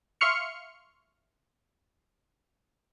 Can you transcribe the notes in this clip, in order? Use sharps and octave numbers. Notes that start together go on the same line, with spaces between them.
E5 F5 C6 C#6 F6 C#7